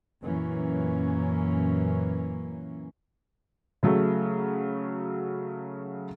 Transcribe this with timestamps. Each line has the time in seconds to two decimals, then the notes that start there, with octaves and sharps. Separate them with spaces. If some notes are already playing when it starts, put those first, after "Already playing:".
0.23 F#2 A#2 E3 A#3 C#4
3.83 C#3 F#3 A3